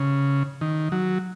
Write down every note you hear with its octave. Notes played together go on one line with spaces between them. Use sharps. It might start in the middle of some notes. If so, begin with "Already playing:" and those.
Already playing: C#3
D#3
F#3